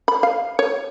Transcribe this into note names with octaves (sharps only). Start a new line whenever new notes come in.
B5
F5
C#5